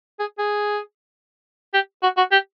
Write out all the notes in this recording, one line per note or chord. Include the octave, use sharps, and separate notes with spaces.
G#4
G#4
G4
F#4
F#4
G4